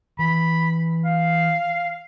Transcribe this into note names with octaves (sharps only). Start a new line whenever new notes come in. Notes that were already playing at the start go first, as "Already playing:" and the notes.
E3 B5
F5